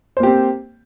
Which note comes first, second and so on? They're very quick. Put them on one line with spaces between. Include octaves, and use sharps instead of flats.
C5 A#3 G4 C4